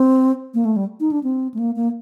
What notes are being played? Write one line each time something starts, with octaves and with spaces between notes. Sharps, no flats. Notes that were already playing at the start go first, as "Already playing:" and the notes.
Already playing: C4
A#3
A3
G3
D#4
D4
C4
A3
A#3
A#3